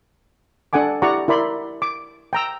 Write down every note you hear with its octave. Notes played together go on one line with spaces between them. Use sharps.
D4 A4 F#5 G#5 D6
E4 G4 D5 F#5 A#5 C#6
E4 A#4 D5 B5 C6
D6
G5 A#5 E6